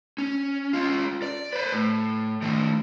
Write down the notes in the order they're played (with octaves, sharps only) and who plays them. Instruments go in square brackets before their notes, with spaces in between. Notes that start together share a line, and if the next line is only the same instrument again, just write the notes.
[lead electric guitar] C#4
C#4 F4
D5
B4 C5
A2
D#3 A3